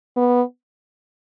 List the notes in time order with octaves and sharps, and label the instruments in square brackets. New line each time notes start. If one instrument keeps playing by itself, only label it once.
[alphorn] B3